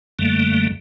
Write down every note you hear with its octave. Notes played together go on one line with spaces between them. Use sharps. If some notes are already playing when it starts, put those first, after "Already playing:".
F#2 D3 G3 A3 A#3